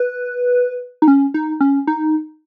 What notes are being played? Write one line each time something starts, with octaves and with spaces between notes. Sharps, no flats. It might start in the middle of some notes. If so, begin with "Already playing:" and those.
Already playing: B4
D#4
C#4
D#4
C#4
D#4